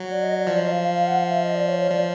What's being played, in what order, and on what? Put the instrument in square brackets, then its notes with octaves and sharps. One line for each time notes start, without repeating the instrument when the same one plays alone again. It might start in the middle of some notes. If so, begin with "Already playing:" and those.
Already playing: [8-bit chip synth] F#3
[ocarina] D5
D#5
D5
[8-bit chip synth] F3 [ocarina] D5
[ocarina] D#5
F5
F5
F5
F#5
F5
E5
D#5
D5
C#5
C#5
[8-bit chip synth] F3 [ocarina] D5